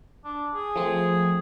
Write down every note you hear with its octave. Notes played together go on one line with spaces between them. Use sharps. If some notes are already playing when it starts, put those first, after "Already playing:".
D4
G#4
F3 A3 C4